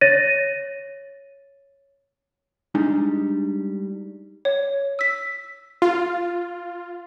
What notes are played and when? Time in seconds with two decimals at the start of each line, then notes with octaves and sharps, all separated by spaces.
0.01 C#5 A6 A#6 D#7
2.75 G3 G#3 D4 D#4
4.45 C#5
4.99 E6 B6
5.82 F4